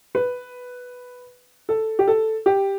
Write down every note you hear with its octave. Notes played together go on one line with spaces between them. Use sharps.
B4
A4
G4
A4
G4